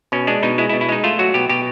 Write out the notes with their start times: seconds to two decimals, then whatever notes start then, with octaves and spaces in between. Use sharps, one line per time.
0.12 B2 C#4
0.27 G#3 D4
0.43 B2 D#4
0.58 G#3 E4
0.69 E4
0.73 B2
0.81 E4
0.89 G#3 D#4
1.04 A3 F4
1.19 F#3 F#4
1.34 B2 G4
1.49 B2 G4